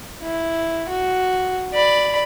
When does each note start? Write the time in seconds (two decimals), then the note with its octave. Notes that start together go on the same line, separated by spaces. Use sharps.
0.22 E4
0.89 F#4
1.73 D5 B5